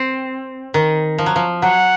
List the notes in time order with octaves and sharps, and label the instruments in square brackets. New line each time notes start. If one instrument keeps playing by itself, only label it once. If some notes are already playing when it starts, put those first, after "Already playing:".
Already playing: [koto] C4
D#3
F3
F#3
F3
[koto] F#3 [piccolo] F#5